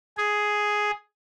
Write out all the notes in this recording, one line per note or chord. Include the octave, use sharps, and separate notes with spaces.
G#4